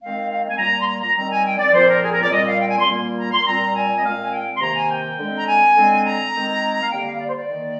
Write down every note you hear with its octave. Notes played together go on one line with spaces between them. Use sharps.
D#3 G#3 C4 F5
F5
G#5
A#2 G3 A#3 A#5
C6
A#5
A#5
D#3 G3 C4 A#5
G#5
G5
D5
A#2 F3 C4 C5
A#4
G#4
A#4
D5
A#2 G3 C4 D#5
F5
G5
G#5
C6
A#2 G3 A#3
A#5
C6
A#2 G3 C4 A#5
G#5
D#5
A#2 G#3 C4 F5
G#5
G5
C6
C3 D#3 A#3 A#5
G#5
G5
D3 G#3 C4
A#5
G#5
D3 G#3 C4
A#5
D#3 G#3 C4
F5
D3 G3 A#3 G5
F5
D5
C5
D5
D#3 A#3